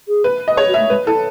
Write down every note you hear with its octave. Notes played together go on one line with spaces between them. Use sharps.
G#4
B4
D#5
G#4 C#5
F#4
E5
A3
G#3 B4
E4 A4